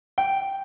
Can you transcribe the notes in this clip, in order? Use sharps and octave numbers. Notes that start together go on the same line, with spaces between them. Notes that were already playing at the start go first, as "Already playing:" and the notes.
G5